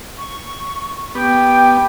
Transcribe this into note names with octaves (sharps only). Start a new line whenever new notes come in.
C#6
B3 G4 G5